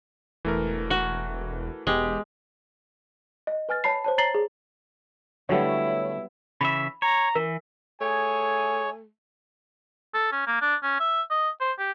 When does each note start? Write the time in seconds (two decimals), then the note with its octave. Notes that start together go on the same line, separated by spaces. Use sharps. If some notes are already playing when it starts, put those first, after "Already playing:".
0.45 E1 E3 A3 A#4
0.90 F#4
1.87 E1 G#3 B3 G4
3.47 D#5
3.69 B4 G#5 F6 A6
3.84 C#5 A5 B5 C7
4.04 C5 C#5 A5
4.18 C#5 A#5 A6 C7 F#7 G7
4.35 G#4
5.49 D3 F#3 G3 A3 B3 E4 C#5
6.61 C#3 E3 E5 B5
7.02 C#5 A#5
7.35 E3 A#4
8.01 A3 G#4 C#5 G#5
10.14 A4
10.32 C#4
10.47 A#3
10.61 D4
10.83 C#4
11.00 E5
11.30 D#5
11.60 C5
11.78 G4